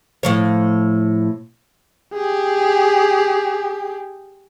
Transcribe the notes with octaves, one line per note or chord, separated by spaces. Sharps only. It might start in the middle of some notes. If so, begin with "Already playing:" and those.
A2 F3 C#5
G4 G#4